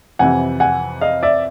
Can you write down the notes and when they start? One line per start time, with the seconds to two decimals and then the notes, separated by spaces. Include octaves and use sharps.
0.19 F2 C3 E3 F#5 G#5
0.60 F#5 G#5
1.01 D#5 F5
1.23 D5 E5